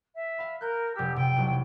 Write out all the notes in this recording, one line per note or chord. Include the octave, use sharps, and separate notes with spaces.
E5
F5 B5
A#4 F#6 G6
F1 G4 E6
C3 G5
E1 B1 F#3